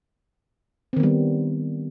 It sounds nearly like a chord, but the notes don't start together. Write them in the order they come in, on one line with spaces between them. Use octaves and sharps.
C4 D#3 B3 G3